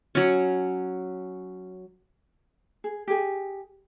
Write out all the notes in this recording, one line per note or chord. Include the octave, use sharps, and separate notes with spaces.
F#3 C#4
G#4
G4 G#4